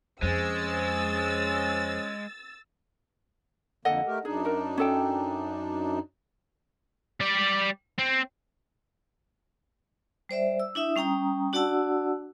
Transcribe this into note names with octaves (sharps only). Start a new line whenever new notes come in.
F2 G#3 C#4 G#4 C5 E6 A6
F2 D3 A#3 A4 D#5 F#5
A3 G4 A#4
F#2 D4 D#4 G#4
F#4 A#4
C#4 A4 G5
G3 D5
C4
G3 C5 D5 E5
E6
D4 E4 E5 D#6
G3 C#4 G5 A#5 D#6
D4 F#4 D5 F#5 A5 E6